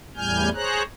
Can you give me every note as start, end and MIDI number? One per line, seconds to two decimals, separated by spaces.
0.16 0.49 40
0.16 0.49 45
0.16 0.49 55
0.16 0.49 80
0.16 0.49 89
0.16 0.49 91
0.54 0.83 68
0.54 0.83 72
0.54 0.83 73
0.54 0.83 82
0.54 0.83 90